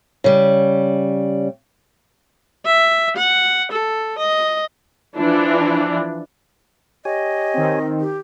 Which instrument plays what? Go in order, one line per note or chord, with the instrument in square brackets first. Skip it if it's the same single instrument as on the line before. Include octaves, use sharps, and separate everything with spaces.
[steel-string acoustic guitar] C#3 G3
[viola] E5
F#5
A4
D#5
[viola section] E3 F3 D4
[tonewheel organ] G4 C#5 G#5 [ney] D#5
[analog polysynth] D#3 C4
[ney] G4